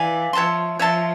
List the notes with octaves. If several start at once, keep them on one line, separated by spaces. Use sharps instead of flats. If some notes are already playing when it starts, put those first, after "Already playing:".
Already playing: E3 D5 F5 G#5
F3 C#5 E5 A5 C6
F3 C#5 E5 A5 C6